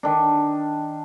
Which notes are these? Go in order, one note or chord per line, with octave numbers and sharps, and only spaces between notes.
D#3 D4